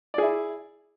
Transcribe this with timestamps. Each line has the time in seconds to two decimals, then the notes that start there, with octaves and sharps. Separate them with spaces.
0.14 D5
0.18 G#4
0.22 E4